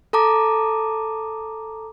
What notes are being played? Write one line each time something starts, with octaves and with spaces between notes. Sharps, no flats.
A4 A5 A#5 D6